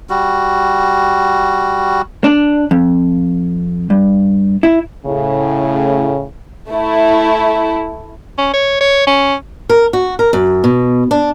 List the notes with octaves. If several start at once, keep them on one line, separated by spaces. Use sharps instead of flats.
G3 F#4
D4
F2
G2
E4
A2 C#3
A3 E4
C#4
C#5
C#5
C#4
A#4
F#4
A#4
F#2
B2
D4